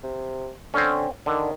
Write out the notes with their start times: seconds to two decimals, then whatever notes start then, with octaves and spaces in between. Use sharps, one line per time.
0.03 C3
0.74 D3 C4 C#4
1.26 D3 D#3